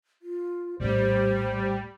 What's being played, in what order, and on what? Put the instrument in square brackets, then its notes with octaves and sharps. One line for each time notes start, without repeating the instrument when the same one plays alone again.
[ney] F4
[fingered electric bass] A#1 A2 A3 [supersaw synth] G3 [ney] C5